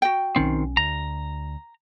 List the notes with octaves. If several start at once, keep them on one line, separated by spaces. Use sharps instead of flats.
F#4 G5
B1 D#3 C4 C#4
D2 A#5